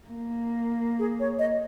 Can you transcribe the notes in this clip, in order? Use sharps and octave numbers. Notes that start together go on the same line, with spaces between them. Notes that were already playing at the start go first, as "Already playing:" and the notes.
A#3
G#4
C#5
D#5